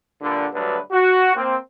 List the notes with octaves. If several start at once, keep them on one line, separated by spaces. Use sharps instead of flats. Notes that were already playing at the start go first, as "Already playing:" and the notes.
G2 A#2 D3
D2 G2 F#3 D4 B4
F#4
A#3 C4